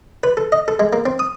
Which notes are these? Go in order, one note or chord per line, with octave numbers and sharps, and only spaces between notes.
B4
A4
D#5
A4
G#3
A#3
C4
D#6